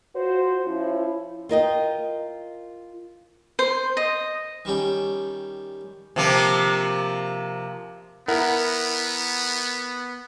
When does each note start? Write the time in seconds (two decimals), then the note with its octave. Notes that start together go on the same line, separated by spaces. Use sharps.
0.15 F4 F#4 C5
0.66 F3 C#4 E4
1.49 F4 A#4 D#5 G5
3.59 C5
3.97 D#5
4.65 D#3 G3 C#4
6.16 C3 F3 A#3
8.28 B3 E4 A#4 F#5